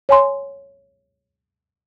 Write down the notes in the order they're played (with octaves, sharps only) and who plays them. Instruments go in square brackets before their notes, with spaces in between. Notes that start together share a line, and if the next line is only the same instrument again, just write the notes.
[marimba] C#5 G#5 C6